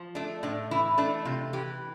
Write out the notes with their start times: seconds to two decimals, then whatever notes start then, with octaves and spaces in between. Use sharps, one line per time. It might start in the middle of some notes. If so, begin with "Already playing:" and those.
Already playing: F3
0.15 A3 D4
0.43 A2 D4
0.71 E3 E4
0.98 A3 D4
1.25 C3 F4
1.53 E3 G4